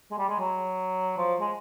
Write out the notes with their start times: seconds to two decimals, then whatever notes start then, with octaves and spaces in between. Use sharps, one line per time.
0.11 G#3
0.18 G3
0.29 G#3
0.39 F#3
1.17 F3
1.41 G#3